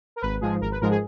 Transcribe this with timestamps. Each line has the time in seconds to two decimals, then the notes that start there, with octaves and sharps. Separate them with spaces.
0.16 A#4
0.21 G#1 B4
0.41 G#2 F3 G#3 G#4
0.61 G#1 A#4
0.71 B4
0.81 G#2 F3 G#3 A#4
0.90 G#4